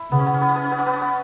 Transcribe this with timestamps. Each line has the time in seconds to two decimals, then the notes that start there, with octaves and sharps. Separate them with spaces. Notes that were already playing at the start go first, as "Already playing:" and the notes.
Already playing: E4
0.11 C#3 B3
0.19 C#4
0.26 B3
0.34 C#4
0.41 B3
0.48 C#4
0.56 B3
0.64 C#4
0.71 B3
0.78 C#4
0.86 B3
0.93 C#4
1.01 B3